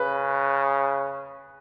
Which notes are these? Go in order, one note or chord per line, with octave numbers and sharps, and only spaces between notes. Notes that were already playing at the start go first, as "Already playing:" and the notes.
Already playing: C#3 B4